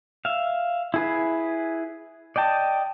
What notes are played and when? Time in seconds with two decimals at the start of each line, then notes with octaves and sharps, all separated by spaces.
0.25 E5 F5
0.94 E4 G#4 B4
2.36 D5 D#5 G5 A5